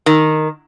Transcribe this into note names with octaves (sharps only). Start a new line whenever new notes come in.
D#3